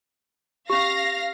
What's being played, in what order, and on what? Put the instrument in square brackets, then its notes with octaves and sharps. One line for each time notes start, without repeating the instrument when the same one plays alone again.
[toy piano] C#4 G4 [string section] F5 A#6